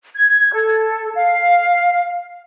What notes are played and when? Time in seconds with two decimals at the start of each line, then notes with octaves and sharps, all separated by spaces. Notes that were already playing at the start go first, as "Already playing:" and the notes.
0.16 G#6
0.53 A4
1.15 F5